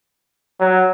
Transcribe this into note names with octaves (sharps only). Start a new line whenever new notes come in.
F#3